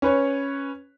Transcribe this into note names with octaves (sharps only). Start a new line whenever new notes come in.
C#4 B4 C#5